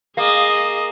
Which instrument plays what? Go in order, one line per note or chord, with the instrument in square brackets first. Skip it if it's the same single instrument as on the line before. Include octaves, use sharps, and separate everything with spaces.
[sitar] A#3 [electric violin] G#4 D#5